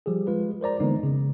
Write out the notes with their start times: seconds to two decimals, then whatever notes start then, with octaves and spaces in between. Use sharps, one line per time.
0.06 F3 G3 G4 G#4
0.27 G#3 F4 B4
0.61 A#4 C5 D5 A#5
0.80 D3 E3 G#3 A#3 B3 D#4
1.03 C#3